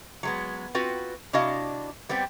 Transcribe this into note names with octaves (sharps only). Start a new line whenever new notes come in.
F#3 G#3 B3
C4 F4 F#4 B4
C3 D4 E4 F#4 D#5 F5
G3 B3 C4 G4